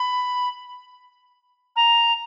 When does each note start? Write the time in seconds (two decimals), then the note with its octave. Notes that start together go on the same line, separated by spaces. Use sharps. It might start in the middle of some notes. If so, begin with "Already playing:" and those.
Already playing: B5
1.76 A#5